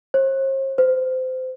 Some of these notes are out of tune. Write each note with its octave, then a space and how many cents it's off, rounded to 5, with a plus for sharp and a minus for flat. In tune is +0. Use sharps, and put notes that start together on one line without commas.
C5 +45
C5 -25